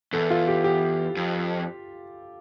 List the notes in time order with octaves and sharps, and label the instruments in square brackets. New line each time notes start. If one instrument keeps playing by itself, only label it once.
[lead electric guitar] E2 [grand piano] A4
[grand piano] F4
G4
G4
[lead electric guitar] F2